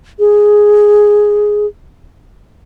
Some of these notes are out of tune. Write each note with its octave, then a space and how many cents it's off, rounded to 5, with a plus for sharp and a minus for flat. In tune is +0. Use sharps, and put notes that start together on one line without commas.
G#4 +0